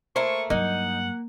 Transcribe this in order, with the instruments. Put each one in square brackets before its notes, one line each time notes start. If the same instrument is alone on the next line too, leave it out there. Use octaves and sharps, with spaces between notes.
[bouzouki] A3 A#3 E4 [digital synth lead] C5 [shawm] C#6
[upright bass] G2 F#3 [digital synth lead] A#3 [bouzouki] D#4 [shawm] F#5